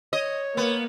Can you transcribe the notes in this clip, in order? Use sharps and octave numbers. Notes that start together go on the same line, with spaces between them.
C#5 D#5
A#3 B3